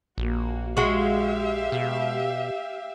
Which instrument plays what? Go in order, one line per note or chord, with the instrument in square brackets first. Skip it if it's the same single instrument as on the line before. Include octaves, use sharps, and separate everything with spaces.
[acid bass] A#1 [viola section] A#3 F#4
[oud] G#3 F#4 [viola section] G4 E5 F5
[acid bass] B2